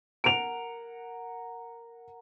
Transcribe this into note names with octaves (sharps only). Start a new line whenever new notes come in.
A#4 F#5 D7 F7